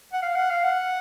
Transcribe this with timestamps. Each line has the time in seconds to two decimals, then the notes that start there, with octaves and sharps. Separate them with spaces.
0.13 F#5
0.22 F5
0.36 F#5
0.50 F5
0.64 F#5